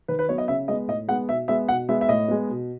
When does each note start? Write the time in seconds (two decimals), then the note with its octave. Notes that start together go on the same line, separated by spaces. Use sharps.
0.08 D#3 B4
0.19 B4
0.28 F#3 B3 C#5
0.38 D#5
0.48 C#3 E5
0.68 G#3 B3 D#5
0.88 A2 D#5
1.08 G#3 B3 F#5
1.29 B2 E5
1.48 G#3 B3 E5
1.69 B2 F#5
1.89 G#3 B3 E5
2.01 E5
2.09 A2 D#5
2.28 G#3 B3
2.49 B2